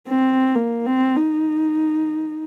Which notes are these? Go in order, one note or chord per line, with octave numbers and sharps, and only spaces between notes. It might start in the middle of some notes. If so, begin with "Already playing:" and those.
C4
A#3
C4
D#4